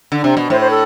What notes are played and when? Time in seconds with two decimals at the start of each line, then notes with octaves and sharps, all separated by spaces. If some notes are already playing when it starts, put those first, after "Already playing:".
0.12 D3
0.24 C3
0.37 B2
0.50 A2 C5
0.60 C5
0.70 A4